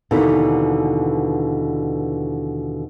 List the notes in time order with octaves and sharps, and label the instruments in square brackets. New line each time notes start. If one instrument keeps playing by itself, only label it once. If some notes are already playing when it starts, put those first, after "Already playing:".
[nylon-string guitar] D#2 B2 D3 E3